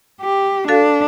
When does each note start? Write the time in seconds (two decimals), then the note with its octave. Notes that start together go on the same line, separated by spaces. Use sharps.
0.21 G4
0.68 D4 F#4 A4 F5